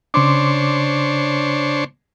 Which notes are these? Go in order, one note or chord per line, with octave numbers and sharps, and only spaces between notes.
C#3 D4 C5 C#5 C6 D6